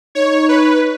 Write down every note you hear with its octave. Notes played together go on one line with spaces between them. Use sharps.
D#4 C#5
B4